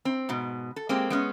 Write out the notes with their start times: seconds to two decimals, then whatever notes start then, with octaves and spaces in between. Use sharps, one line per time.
0.05 C4
0.29 G#2 B2
0.76 A4
0.89 G#3 A#3 C4 G4
1.10 G#3 B3 C#4